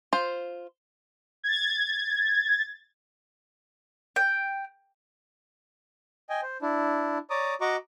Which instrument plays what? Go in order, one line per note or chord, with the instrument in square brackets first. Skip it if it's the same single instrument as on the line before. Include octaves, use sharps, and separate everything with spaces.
[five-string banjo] F4 C5
[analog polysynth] G#6 A6
[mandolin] G5
[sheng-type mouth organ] D#5 G5 G#5
C5
D4 E4
C#5 D5 A#5 D6 D#6
F#4 D#5 A#5 C#6 D6